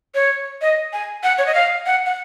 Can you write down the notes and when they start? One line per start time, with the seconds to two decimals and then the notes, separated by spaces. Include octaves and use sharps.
0.15 C#5
0.62 D#5
0.93 G#5
1.23 F#5
1.38 C#5
1.47 D#5
1.55 F5
1.86 F#5
2.06 F#5